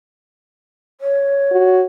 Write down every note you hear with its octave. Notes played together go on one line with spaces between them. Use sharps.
C#5
F#4